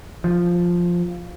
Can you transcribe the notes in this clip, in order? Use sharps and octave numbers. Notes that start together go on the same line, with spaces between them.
F3